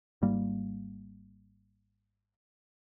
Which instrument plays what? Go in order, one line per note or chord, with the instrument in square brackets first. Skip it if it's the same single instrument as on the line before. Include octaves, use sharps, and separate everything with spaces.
[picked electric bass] G#1 G#2 G3 A#3